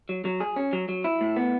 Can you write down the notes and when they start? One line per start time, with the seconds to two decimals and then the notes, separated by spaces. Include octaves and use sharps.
0.09 F#3
0.25 F#3
0.40 G#4
0.56 C#4
0.73 F#3
0.89 F#3
1.04 E4
1.21 A2
1.36 B3